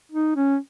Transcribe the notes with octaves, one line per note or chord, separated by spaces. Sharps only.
D#4
C#4